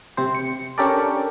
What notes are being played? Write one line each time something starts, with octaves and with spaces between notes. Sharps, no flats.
C3 C4 C5
C#7
C#4 D4 G4 A4 A#4 D5